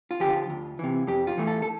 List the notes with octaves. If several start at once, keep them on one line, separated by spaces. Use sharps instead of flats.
F4
D3 F3 G4
F4
D2
C3 E3
F2 G4
F4
E3 A3
A4
A4